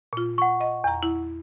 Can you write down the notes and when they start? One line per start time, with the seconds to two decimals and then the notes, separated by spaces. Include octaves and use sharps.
0.13 A#2 F4
0.38 F#5 C#6
0.60 D#5
0.84 E2 A#5
1.03 E4